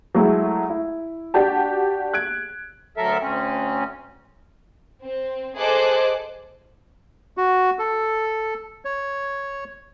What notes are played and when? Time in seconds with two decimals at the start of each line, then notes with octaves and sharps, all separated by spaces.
0.15 F#3 G#3 A3 E4 G#4
0.70 E4
1.34 D4 F#4 G4 A5
2.13 F#6 G#6 D7
2.97 D2 F#3 A4 A#4 E5
3.21 D2 C4 C#4
5.03 C4
5.58 G#4 A4 C5 D#5 D6 F#6
7.37 F#4
7.79 A4
8.85 C#5